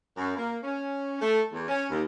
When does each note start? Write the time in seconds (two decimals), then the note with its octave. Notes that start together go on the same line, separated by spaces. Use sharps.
0.17 F#2
0.36 A#3
0.63 C#4
1.22 A3
1.52 E2
1.68 C#4
1.90 D#2